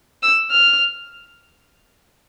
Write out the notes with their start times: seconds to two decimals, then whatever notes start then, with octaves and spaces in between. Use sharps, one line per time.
0.23 E6
0.51 F6